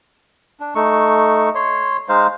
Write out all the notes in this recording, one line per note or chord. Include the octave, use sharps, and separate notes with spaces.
D4
A3 D#4 C#6
C#5 C6
G#3 D#4 C5 F5